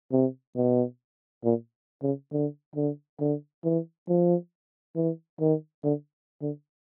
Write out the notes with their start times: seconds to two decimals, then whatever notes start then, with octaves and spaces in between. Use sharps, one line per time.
0.12 C3
0.56 B2
1.44 A#2
2.03 C#3
2.32 D3
2.75 D3
3.20 D3
3.64 E3
4.08 F3
4.96 E3
5.40 D#3
5.84 D3
6.42 D3